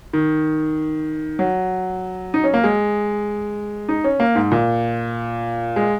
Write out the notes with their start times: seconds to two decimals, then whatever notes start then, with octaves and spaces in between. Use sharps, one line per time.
0.13 D#3
1.39 F#3
2.34 D#4
2.44 C#4
2.54 A#3
2.64 G#3
3.89 D#4
4.04 C#4
4.20 A#3
4.35 G#2
4.51 A#2
5.76 G#3